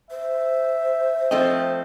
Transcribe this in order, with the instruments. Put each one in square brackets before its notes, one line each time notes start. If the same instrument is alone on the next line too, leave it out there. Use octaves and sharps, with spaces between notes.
[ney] C5 [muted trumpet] E5
[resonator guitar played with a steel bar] F3 A3 C4 [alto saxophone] D#5